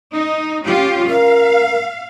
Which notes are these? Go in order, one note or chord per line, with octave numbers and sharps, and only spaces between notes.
D#4
C#4 F4 G4
A#4 F5